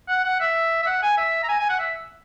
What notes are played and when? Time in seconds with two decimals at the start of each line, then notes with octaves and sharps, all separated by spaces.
0.09 F#5
0.25 F#5
0.41 E5
0.83 E5
0.87 F#5
1.03 G#5
1.18 E5
1.43 A#5
1.49 G#5
1.60 G#5
1.70 F#5
1.80 E5